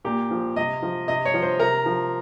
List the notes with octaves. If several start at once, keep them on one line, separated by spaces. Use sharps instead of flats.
A#2 G4
F3
C3 D#5
F3
C3 D#5
C#5
F3
C5
C3 A#4
F3